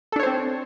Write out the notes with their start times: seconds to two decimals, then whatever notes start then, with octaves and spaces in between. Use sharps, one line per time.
0.12 A4
0.16 D4
0.19 C#5
0.23 C5
0.27 C4